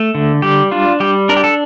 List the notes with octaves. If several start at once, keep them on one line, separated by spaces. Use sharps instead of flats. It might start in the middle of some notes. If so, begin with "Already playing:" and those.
Already playing: A3
D3
G3 G4
D4 F4
G3 G4
D4 A#4
G4
A4